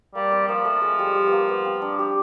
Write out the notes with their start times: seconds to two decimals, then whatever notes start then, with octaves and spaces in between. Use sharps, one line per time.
0.15 G3 A#3
0.32 C4
0.48 F3 A#3
0.65 A3
0.82 G#3
0.99 G3
1.15 G3
1.27 B3
1.32 A#3
1.49 B3
1.65 C4
1.82 D4
1.99 G4